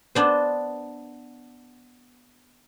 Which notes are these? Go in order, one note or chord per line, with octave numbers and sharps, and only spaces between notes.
B3 D4 C5